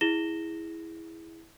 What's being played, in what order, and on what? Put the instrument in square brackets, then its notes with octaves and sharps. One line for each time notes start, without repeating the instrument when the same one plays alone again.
[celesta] E4 G#4 A#6 E7 G7